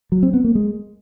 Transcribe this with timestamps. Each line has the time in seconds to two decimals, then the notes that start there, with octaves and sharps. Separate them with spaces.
0.12 F#3
0.23 C4
0.34 B3
0.44 A#3
0.55 G#3